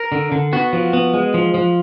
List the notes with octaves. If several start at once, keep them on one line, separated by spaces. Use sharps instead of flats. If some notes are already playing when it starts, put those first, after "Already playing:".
Already playing: A#4
D3
D3
B3 F#4
F3
B3
G#3
F3
F3